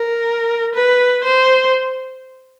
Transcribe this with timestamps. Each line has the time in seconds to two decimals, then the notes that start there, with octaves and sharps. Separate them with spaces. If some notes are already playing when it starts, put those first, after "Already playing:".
Already playing: A#4
0.75 B4
1.24 C5